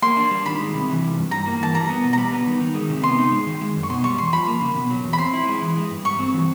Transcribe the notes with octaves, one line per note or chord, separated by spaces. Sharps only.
A#3 C6
D4
G3
D#3 B5
G#3
C3
E3
G3
G2
G3 A#5
A#3
E3 A5
G3 A#5
B3
B2
A#5
G3 B5
B3
D#3
D#3
G#3
C3
B3 C6
D#4
G#3
D#3
G#3
F#2
C#6
B2 C6
G3 C#6
E2 C6
F3 B5
A#3
C#3
B2
F#3
E2
B5
C4 C6
E4
G#3
E3
G#3
G2
G3 C#6
C4
E3